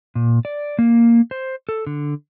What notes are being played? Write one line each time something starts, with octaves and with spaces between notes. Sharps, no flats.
A#2
D5
A#3
C5
A4
D3